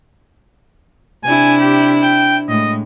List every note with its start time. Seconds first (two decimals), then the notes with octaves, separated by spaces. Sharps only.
1.24 C3 D4 E4 G#5
1.60 G4
2.02 G5
2.48 A2 G#3 D#5